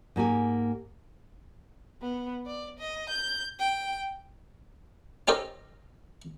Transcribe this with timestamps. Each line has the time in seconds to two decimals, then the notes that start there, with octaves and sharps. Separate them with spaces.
0.16 G#2 A#3 G4 G#5
2.02 B3
2.46 D5
2.79 D#5
3.09 G6
3.59 G5
5.28 C#4 D#4 G4 A4 A#4 C5